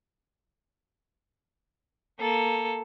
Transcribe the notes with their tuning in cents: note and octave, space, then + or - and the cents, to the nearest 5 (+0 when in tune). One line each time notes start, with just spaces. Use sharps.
A#3 +0 A4 +0